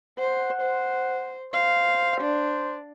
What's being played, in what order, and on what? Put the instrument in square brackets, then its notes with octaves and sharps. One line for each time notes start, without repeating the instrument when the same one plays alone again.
[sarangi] C5 [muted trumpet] F#5
[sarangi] C5
[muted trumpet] C5 [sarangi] F5
[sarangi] D4